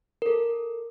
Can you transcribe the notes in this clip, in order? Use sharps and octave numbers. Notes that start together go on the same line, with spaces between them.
A4 A#4